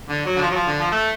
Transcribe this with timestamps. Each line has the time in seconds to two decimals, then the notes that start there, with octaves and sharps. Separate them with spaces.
0.09 D3
0.25 F#3
0.36 D3
0.42 F3
0.51 F#3
0.55 F3
0.67 D3
0.79 F3
0.92 A3